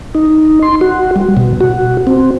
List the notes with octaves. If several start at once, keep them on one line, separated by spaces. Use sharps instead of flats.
D#4
C6
F#4
G3
B2
F#4
C4